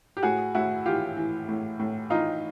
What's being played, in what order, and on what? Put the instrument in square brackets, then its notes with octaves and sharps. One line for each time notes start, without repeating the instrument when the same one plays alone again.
[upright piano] G4
A2 F#4 G#4
A2 E4 F#4
E3 F4 G4
E3
A2
A2
E3 D#4 F4